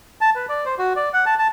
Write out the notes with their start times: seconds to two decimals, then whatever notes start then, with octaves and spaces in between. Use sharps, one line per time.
0.21 A5
0.35 B4
0.49 D5
0.66 C5
0.78 F#4
0.96 D5
1.14 F#5
1.26 A5
1.39 A5